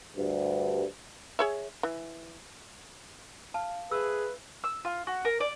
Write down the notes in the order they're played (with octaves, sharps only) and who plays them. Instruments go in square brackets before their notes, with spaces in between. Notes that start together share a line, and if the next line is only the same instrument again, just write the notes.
[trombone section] D2 G2
[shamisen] G#4 C#5 E5
E3
[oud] F5 [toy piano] A5
[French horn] G#4 [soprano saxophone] B4 [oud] C5 E5 [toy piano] E6
[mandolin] E6
F4
F#4
A#4
D5